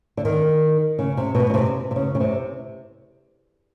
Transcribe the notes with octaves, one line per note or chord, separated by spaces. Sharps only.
D3
D#3
C#3
C3
B2
C#3
C3
C3
C#3
C#3
C3